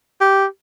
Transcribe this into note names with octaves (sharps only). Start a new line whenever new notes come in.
G4